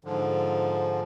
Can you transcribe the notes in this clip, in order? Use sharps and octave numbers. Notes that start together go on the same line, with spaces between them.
G#2 D3 F3